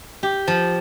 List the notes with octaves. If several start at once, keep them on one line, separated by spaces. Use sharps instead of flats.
G4
F3